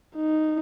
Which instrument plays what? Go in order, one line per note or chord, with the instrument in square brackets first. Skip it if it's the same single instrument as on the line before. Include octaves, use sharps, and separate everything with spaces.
[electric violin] D#4